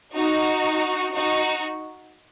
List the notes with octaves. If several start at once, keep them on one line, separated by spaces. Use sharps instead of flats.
D#4 F#4
D#4 F#4